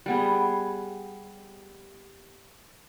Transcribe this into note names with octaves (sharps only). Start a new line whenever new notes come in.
G3 B3 G#4